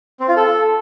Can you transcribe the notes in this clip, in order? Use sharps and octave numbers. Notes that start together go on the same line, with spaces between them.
C4
F4
A4